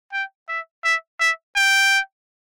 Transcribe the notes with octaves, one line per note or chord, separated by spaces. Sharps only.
G5
E5
E5
E5
G5